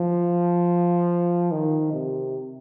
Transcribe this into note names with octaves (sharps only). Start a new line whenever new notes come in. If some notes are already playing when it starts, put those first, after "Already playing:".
Already playing: F3
D#3
C3